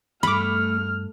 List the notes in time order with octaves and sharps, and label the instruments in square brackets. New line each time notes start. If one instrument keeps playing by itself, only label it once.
[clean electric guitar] C#2 G2 [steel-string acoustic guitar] A3 [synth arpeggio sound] B5 D6 [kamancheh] F6